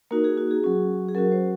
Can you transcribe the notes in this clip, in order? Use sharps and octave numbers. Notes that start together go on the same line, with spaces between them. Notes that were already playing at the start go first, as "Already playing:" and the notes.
A#3 D#4 F#4 A#4
G#4
F#4
G#4
F#3 C#4 F#4
G#4
F#3 C#4 F#4 A#4
C5